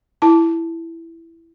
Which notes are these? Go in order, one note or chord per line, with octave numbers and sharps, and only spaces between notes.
E4 A5